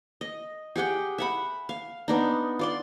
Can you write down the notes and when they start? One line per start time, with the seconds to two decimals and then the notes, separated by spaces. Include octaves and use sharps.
0.21 D#5
0.76 G4 G#4 F#5 G5
1.18 E5 F#5 B5
1.69 F5
2.08 B3 D4 D#4
2.59 F4 D5 C6